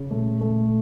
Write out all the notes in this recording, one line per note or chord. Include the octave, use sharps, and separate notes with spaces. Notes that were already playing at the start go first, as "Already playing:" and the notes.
Already playing: C#3
A#2 A3
A3